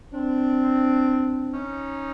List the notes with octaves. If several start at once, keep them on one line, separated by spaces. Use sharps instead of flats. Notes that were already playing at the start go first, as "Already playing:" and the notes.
C4 D4
C#4 D#4